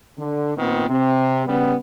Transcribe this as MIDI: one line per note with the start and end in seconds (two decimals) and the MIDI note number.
0.17 0.56 50
0.57 0.86 46
0.57 0.86 51
0.57 0.86 59
0.57 0.86 60
0.89 1.45 48
1.47 1.74 49
1.47 1.74 55
1.47 1.74 59